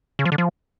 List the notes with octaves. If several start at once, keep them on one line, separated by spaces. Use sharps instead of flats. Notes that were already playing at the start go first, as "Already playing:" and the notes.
C#3
F3
D3
F3